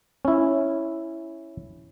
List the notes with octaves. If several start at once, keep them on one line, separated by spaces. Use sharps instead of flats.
C#4 E4